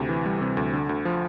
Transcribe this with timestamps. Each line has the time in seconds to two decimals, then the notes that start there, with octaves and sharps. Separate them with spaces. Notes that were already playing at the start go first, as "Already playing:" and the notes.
Already playing: D2 C3
0.09 E3
0.26 G3
0.41 C3
0.57 D2
0.73 D3
0.89 D2
1.05 F3